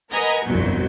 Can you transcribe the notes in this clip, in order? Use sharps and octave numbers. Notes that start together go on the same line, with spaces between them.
A#4 B4 D#5 F#5 G#5 A#5
G1 C2 F2 B2 F#3 G6